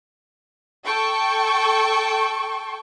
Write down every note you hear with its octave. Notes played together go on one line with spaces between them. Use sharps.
A4 G5 C#6